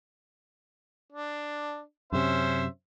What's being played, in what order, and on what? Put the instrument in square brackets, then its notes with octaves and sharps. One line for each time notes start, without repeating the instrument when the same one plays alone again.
[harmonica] D4
[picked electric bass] F#2 C3 [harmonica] C#4 C5 E5